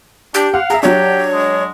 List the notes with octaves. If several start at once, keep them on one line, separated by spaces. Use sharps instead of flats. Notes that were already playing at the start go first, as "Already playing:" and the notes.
D4 G4
F5 F#5
G#4 E5 A#5
F#3 D4 G4 C#5
G#3